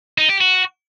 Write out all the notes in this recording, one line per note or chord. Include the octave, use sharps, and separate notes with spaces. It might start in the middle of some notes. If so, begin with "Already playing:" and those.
D#4
G4
F#4